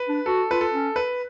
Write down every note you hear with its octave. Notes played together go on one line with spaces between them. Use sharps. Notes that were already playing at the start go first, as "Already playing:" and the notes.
Already playing: B4
D4
F#4 A4
F4 B4
A4
C#4
B4